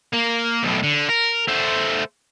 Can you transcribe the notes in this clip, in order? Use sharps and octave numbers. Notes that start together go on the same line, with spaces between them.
A#3
B1 A2
D3
A#4
A3 C5